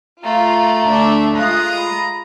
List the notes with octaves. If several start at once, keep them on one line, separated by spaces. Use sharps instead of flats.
A3 F4 A#5
D2 D4 E5
G#3 F4 A#5 D#6 F#6
B5